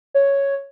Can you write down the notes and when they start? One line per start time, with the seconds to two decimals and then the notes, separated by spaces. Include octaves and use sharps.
0.14 C#5